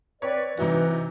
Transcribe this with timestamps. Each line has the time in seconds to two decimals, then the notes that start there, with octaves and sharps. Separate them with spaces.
0.22 C4 B4 C#5 D5
0.57 C3 E3 D#4 F#4